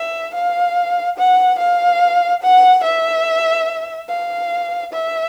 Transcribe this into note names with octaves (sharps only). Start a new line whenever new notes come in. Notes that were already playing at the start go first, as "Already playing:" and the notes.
Already playing: E5
F5
F#5
F5
F#5
E5
F5
E5